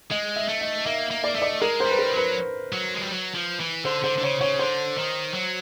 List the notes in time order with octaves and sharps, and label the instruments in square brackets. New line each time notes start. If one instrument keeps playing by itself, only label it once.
[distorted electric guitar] G#3 [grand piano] D#5
[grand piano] E5
[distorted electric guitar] A3
[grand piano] D#5
[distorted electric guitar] A#3 [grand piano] E5
[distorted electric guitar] A#3
[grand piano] D5
[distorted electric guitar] A3 [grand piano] D#5
[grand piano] D5
[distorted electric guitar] G#3 [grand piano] A#4
[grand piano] C5
[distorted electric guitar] G3
[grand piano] B4
A#4
[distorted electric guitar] F#3
[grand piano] B4
[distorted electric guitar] F#3
G#3
G3
F#3
F3
E3
[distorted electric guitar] D3 [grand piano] C5
[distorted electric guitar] D3 [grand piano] C5
[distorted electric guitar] D3
[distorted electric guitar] C#3 [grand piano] C#5
[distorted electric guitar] C#3 [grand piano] C#5
[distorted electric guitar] D3 [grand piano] C5
[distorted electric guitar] D#3
F#3